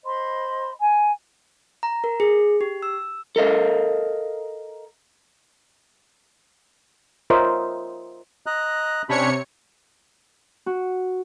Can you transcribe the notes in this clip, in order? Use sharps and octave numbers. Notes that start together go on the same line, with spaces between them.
C5 D#5 B5 C6
G#5
A#5
A#4
G#4
G4
E6
A4 A#4 D#5 F5
F4 A#4 C5 C#5 D#5 E5
D#5 A#5 F#6
C3 C#4 D4 C#5 B5 C#7
F#4